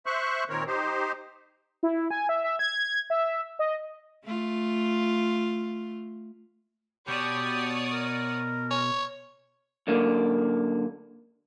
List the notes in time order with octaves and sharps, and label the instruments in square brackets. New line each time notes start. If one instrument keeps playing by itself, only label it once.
[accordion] C5 E5 C#6 F#6
A#2 D#3 C4 A#4 C#5
D#4 G4 C5
[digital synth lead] E4
G#5
E5
E5
G#6
E5
D#5
[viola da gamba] A3 F4
[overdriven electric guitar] B2 [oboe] G4 [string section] C#5 D5 D#6
[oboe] A#4
[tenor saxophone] C#5
[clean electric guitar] F#2 D3 A#3